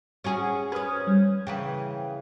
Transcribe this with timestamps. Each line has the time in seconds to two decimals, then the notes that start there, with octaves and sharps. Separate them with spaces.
0.24 C#4 F#4 G#4
0.72 C#4 B4 D#6 F6 G#6
1.07 G3
1.47 C#3 E3 B4 G5